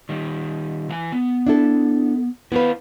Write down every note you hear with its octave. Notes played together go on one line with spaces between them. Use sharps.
D#3 G3
E3 F5 G#5
B3
D4 E4 A4
B3 E4 B4 C5 F5